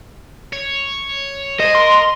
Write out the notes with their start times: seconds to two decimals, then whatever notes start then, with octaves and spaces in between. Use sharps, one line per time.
0.53 C#5
1.60 G#4 C5 D#5
1.75 A#4 C6